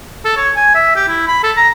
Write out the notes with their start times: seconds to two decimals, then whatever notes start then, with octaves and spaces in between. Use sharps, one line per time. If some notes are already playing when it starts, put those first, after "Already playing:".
0.25 A4
0.37 C#5
0.56 G#5
0.75 E5
0.96 G4
1.08 E4
1.27 B5
1.43 A4
1.57 A#5